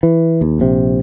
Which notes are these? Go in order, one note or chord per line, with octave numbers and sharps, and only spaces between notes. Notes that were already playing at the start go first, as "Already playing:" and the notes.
E3
D#2
A#1 C3